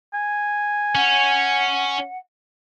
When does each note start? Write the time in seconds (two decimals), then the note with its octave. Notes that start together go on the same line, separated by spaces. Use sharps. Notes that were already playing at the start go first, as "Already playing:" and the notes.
0.14 G#5
0.95 C#4 F#5